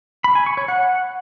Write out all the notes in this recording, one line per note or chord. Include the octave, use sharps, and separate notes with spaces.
B5
G#5
C#6
C#5
F#5